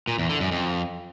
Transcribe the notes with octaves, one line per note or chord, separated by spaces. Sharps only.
A#2
E2
D3
F#2
F2